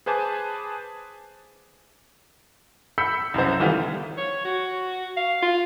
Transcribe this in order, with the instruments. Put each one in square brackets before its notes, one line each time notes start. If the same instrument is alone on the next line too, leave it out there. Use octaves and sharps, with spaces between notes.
[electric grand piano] G#4 B4 C5 G#5 A5 D6
[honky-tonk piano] B5 E6 G6 B6 C#7
C2 F#2 C#3 C5
D#3 E3 G3 A3 B3 F4
[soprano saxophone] C#5
F#4
F5
F4